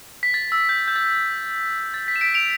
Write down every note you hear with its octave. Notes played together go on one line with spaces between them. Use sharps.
B6
A6
E6
G6
G6
A6
G6
A6
B6
E7
B6 D7
D7 F7